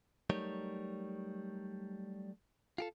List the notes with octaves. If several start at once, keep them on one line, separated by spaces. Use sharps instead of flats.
F#3 G3 A3 D#4 A#4 C#5
F4 G4 A4